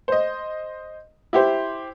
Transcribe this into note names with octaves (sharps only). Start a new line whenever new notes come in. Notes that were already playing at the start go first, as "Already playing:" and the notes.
C5 D#5
E4 G4 C5